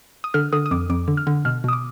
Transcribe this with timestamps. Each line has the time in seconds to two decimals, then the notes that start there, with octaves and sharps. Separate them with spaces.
0.24 D#6
0.34 D3 F6
0.53 D3 D#6
0.66 D#6
0.71 F2 D6
0.90 F2 D6
1.08 D3
1.17 F6
1.27 D3
1.45 B2 F6
1.64 B2 D#6
1.73 D6